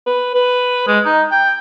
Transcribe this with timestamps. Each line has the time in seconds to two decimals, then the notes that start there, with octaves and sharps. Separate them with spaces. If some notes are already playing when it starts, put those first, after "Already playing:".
0.06 B4
0.35 B4
0.87 G#3
1.05 D#4
1.31 G5